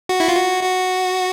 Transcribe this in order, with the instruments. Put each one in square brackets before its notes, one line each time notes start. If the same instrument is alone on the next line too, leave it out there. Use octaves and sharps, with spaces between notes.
[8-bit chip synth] F#4
E4
F4
F#4
F#4